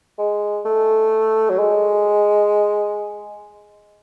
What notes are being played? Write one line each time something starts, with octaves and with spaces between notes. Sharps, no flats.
G#3
A3
F#3
G#3